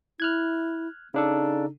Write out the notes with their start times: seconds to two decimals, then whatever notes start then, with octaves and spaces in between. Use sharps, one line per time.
0.20 E4 F6 F#6 G#6
1.14 C#3 D4 D#4 A4